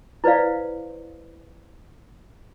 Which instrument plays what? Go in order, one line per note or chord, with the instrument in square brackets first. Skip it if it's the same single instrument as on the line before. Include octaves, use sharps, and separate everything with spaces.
[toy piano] E4 B4 C5 D5 F5